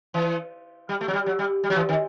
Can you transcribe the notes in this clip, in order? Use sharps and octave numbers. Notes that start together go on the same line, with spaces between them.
E3
G3
A3
F#3
G3
F#3
G3
G3
F#3
E3
D#3